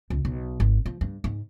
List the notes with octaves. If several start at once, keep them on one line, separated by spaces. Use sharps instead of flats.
C#2
B1
G#1
F3
G2
G#2